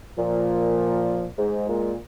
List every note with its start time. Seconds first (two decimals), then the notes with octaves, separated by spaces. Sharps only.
0.18 A#2 F3
1.38 G#2 G#3
1.69 A#2